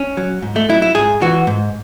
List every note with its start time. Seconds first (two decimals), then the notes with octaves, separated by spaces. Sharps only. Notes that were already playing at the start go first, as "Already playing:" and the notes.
Already playing: C#4
0.17 F#3
0.42 G#2
0.56 A3
0.69 F#3 E4
0.82 E4
0.95 G#2 G#4
1.22 E3 F#4
1.47 G#2